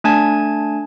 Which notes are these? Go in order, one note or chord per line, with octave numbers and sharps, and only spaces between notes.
A3 D4 G#5 A5 G#6